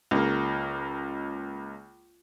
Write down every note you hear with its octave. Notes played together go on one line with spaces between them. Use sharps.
C#2 G#3 A#3